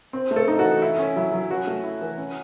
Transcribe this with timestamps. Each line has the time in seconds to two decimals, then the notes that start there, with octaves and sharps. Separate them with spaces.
0.13 C4
0.31 A3
0.36 A4
0.48 D#4
0.59 F#4
0.64 E3
0.82 E4
0.98 C#4
1.16 F#3 E4
1.33 F#3
1.50 C#4 F#4
1.67 A3
1.83 E4
2.01 E3
2.18 C#4